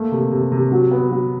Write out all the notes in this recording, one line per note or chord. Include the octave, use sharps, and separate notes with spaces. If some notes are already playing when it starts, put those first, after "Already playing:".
Already playing: A3 A#3
C3
C3
C3
F#3
B3
F#3